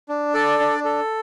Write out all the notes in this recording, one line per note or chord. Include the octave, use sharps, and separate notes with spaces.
D4
A4 D5
D4
A4